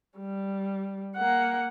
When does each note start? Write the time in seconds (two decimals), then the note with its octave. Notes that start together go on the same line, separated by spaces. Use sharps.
0.19 G3
1.16 A#3 F#5